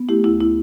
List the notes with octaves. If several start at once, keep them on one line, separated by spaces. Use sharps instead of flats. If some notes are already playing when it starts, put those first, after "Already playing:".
Already playing: B3
A3 E4 G4
D2 E4
E4